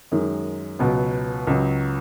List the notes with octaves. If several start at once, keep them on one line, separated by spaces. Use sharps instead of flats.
F#2 D#3 G#3
C#2 B2 F#3 B3
C#2 C#3 F#3